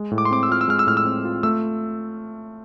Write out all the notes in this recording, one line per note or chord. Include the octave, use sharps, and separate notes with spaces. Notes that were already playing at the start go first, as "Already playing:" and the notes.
Already playing: G#3
A2
D6
C6
C4 D6
E6
F4 F6
E6
G#3 F6
E6
A2 F6
E6
C4
F4
A3 E6